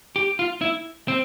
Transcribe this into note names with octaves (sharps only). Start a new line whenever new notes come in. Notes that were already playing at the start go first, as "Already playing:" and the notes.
G4
F4
E4
C4